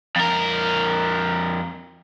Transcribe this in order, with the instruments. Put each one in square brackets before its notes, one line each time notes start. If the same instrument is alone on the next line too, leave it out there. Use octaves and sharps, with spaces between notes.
[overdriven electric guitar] F2 A#4